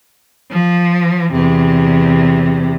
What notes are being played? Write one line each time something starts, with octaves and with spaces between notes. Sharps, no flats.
F3
E2 C3